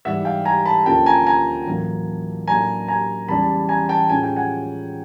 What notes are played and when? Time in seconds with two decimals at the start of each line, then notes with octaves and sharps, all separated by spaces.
0.05 G#2 E3 G3 E5 F#5
0.25 F5 G5
0.45 G#5 A#5
0.66 A5 B5
0.85 D2 D3 F3 A#3 C#4 G5 A5
1.06 G#5 A#5
1.27 G#5 A#5
1.67 A1 A2 F#3 A#3
2.47 A2 F#3 A#3 D4 G#5 A#5
2.88 G#5 A#5
3.28 E2 C#3 E3 G3 A5 B5
3.69 G#5 A#5
3.89 G5 A5
4.10 A2 F3 G#3 C#4 G#5
4.23 G5
4.36 F#5 G#5